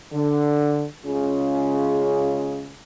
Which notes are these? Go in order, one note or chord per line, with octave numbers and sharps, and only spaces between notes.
D3
C#3 G#3 C#4 F4 G#4